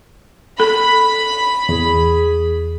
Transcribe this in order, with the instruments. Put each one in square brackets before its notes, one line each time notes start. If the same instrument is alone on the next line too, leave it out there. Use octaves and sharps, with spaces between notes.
[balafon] A4 [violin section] B5
[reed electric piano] E2 [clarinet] G#4